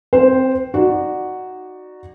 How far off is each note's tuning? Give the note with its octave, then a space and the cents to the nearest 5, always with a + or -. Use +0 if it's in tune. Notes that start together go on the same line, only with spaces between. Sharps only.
C4 +0 C5 +0 G5 +0
D#4 +0 F#4 +0 D5 +15